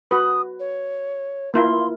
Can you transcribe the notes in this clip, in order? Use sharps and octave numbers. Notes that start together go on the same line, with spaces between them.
F#4 B4 D#6
C#5
A#3 E4 F4 C6